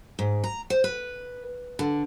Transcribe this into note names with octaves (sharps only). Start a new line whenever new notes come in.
G#2
A#5
C5
B4
D3